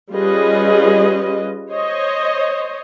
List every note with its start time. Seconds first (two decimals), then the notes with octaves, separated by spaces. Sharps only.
0.12 G3 C#4 F4 G#4 B4 D#5
1.70 C5 C#5 D#5